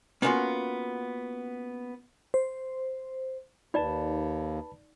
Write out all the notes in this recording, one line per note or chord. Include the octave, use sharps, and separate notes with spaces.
A#3 B3 C#4 D4 F4 F#4
C5
D#2 D#4 B4 D5 A5 B5